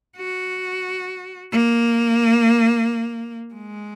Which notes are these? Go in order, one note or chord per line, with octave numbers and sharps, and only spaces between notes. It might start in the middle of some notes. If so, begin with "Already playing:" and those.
F#4
A#3
G#3